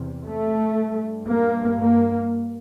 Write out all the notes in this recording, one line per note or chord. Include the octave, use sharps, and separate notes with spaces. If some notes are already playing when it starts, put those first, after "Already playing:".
Already playing: E2 C3
A3
G2
A#3
A#3